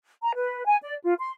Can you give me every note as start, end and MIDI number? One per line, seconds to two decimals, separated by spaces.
0.23 0.32 82
0.36 0.64 71
0.67 0.76 80
0.82 0.96 74
1.04 1.13 65
1.19 1.31 84